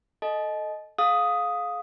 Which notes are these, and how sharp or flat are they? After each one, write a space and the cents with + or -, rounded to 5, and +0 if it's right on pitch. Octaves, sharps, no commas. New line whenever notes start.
A4 +0 D#5 +0 A5 -45
G#4 +35 F5 +20 D#6 +5